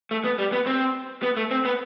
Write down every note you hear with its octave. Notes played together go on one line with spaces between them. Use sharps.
A3
B3
G3
B3
C4
B3
A3
C4
B3